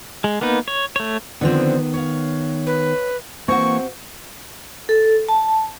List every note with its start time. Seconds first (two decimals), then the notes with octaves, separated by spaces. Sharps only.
0.24 G#3
0.41 A#3 B3 D#4 B4
0.68 C#5
0.96 A3 C#5
1.41 D3 D#3 F3 B3 C4
1.94 C#5 F5
2.66 B4
3.48 E3 A#3 C4 F#4 G#5 C#6
4.89 A4
5.29 A5